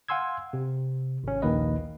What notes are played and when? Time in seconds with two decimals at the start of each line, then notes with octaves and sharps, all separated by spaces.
0.08 F5 F#5 G#5 C6 E6 G#6
0.53 C3
1.24 G#1 C#4
1.42 A#1 D#2 D#3 A#3 B4 D#5